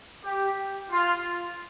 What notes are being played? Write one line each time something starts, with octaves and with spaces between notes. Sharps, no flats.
G4
F4